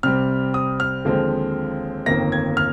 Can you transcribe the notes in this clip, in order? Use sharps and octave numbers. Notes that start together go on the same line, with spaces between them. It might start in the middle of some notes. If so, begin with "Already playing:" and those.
C2 C3 G3 C4 F6
D#6
F6
D#2 D3 F3 G#3 C4
G1 F2 D#3 A#3 A#6
G#6
F6